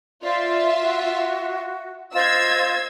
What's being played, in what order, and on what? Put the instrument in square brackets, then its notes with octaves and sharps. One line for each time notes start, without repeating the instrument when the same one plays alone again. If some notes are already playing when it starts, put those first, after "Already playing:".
[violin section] F4 E5 [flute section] C5 D5 F5
[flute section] F#4
[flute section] F4 C5 D#5 [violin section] E6 G#6